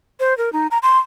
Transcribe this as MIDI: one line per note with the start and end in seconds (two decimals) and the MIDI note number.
0.20 0.36 72
0.38 0.52 70
0.53 0.67 63
0.71 0.78 82
0.83 0.98 84